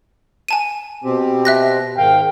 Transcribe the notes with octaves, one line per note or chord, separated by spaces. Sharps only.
G#5 A5 D#7
B2 C4 G4
E5 F#6 A#6
G#2 D#3 F5 G5